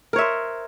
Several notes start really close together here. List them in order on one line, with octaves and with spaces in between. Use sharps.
A#4 C#5 E5 C5